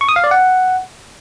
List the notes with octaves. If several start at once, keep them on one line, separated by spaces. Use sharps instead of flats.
C#6
D#6
F5
D5
F#5